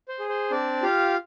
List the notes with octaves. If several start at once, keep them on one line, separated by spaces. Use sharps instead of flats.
C5
G#4
C5
C4 D4 D5
F4 G4 F5